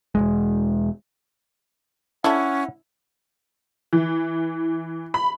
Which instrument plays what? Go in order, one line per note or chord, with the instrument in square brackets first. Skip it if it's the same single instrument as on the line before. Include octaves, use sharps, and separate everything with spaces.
[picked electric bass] E1 E2 G#3
[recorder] C#4 [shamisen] D4 A4 [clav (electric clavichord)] E4 [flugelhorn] F#5
[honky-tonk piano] E3
B5